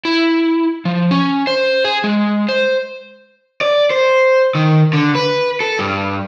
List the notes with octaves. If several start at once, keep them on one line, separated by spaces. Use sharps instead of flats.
E4
F3
C#4
C5
G#4
G#3
C5
D5
C5
D#3
D3
B4
A4
G2